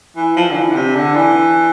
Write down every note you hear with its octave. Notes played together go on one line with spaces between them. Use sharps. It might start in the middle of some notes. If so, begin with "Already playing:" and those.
E3
F3
D3
E3
D3
C3
D3
E3